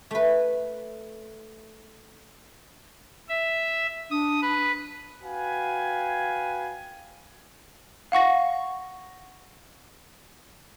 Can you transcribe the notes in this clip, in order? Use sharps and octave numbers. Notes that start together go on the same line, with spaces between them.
A3 B4
E5
D4 D#6
B4
F#4 B4 F5 G5 G#5
F5 F#5 C#6 A#6